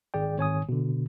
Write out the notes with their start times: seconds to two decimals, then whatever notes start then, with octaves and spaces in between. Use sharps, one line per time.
0.14 G#1 G#4 D5 G5
0.37 G#1 C#5 G#5 D#6
0.69 B2 D3